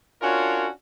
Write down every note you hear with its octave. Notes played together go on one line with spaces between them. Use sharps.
C#4 D4 F4 F#4 A#4 C#5